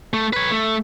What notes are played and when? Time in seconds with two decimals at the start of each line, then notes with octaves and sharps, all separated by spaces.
0.14 A3
0.33 B4 C#5
0.51 A3